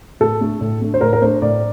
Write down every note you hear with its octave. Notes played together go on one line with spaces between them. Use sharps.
A2 A4
A3 D4
A2
A3 D4
C5
A2 A#4
A#4
A3 D4 C5
A2 D5